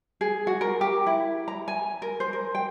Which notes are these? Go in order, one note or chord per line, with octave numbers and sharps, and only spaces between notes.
G#4
F#4
A#4
G4
E4
A#5
G#5
A#4
C5
A#4
G5